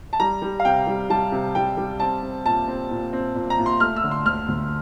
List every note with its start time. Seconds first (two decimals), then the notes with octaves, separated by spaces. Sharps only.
0.13 A5
0.20 G3 A#5
0.42 G3
0.60 F5
0.65 C3 G5
0.87 G3
1.09 G3 A5
1.32 C3
1.55 G3 G5
1.77 G3
2.00 C4 A5
2.22 C4
2.46 A#2 A5
2.68 C4
2.90 A#2
3.13 C4
3.35 A#2
3.50 A#5
3.59 A#2
3.66 C6
3.80 A3 F6
3.96 E6
4.04 D3
4.11 C6
4.25 D2 F6
4.48 D2